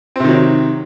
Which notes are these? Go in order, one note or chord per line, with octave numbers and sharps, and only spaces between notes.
C3 D#3 F#3 C4